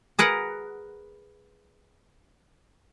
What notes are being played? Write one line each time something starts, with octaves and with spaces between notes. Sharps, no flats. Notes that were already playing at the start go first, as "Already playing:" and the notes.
G#4 A#4 B4 F#5